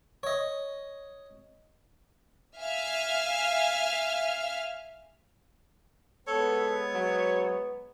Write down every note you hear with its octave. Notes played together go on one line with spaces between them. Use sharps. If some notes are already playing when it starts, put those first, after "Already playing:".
C#5 D#5
E5 F5 G#5 F6
G#3 B3 A4 C#5
F#3